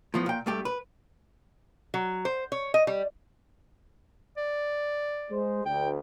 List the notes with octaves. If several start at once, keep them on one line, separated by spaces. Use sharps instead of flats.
A2 F3 B3
A#2 G5
G2 A3 G4
B4
F#3
C5
C#5
D#5
G3
D5
G#3 C5
D2 G5